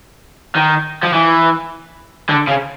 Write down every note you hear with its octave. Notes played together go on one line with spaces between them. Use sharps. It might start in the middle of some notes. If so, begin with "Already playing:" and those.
D#3
F3
E3
D3
C#3